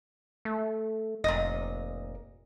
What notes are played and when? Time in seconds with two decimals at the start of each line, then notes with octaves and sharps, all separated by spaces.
0.45 A3
1.24 F1 A#2 D#5